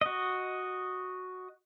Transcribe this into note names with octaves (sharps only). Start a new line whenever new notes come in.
F#4 D#5